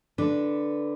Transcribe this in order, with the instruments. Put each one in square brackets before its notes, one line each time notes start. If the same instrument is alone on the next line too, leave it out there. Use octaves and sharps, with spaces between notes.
[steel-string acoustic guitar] D3 D4 B4